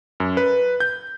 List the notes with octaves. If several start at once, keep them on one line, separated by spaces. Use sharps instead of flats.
F#2
B4
G6